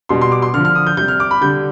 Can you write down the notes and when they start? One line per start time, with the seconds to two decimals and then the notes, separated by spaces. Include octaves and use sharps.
0.09 B2 G3 C6
0.21 C6
0.32 D6
0.42 C6
0.54 D3 F3 F6
0.65 F6
0.75 D#6
0.87 G6
0.97 C3 G3 G6
1.08 F6
1.20 D6
1.31 B5
1.41 D3 G3 G6